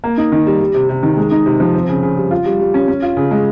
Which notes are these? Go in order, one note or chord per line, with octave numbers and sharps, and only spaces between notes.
A#3
D#4
D#3
G3
G3
C3
C3
D#3
G#3
D#4
C3
F3
C4
C#3
C#3
G3
F4
G3
G3
C#4
C#4
F4
C#3
G#3